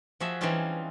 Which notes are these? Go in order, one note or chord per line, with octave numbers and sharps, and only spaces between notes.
F3 F#4 G#4 E5
E3 G3 C4 C#4 D#4 F4